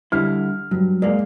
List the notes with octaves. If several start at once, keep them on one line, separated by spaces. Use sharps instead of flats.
D3 G3 E4 F6
G2 F#3
G#2 A#3 D5